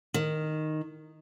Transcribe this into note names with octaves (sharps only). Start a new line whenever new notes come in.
D#3